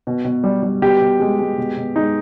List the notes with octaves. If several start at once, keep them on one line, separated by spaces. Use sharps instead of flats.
B2
B2
G3
G3
B2 G4
B2
G#3
G#3
B2
B2
G#3 D#4